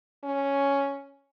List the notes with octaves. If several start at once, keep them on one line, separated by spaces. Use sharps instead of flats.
C#4